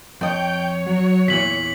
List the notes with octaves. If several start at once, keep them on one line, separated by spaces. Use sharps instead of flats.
F2 C#5 D#5 G5 G6
F#3
E2 A#2 E3 B6 F#7